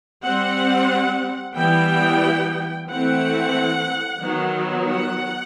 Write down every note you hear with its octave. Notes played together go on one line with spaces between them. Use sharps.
G3 C4 F#5
E3 G3 B3 G5
E3 A3 C4 F#5
D#3 F#3 B3
F#5